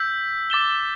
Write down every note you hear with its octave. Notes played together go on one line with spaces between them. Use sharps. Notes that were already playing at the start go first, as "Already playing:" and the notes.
Already playing: E6 G6 B6
D6 A6 E7 G7